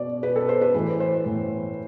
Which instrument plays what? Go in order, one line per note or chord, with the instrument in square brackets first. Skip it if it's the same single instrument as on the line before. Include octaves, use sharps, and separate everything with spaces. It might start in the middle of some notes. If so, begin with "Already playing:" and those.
Already playing: [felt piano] B2 D5
B2 B4
A4
C5
B4
A2 E3 B4
C5
A2 E3